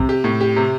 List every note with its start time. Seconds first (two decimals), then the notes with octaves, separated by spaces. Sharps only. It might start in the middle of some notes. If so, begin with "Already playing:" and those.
Already playing: C3 C4
0.09 G4
0.24 A2
0.41 G4
0.56 C3